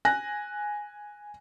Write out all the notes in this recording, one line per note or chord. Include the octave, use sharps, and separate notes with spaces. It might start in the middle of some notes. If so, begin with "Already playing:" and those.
G#5 F#6 A#6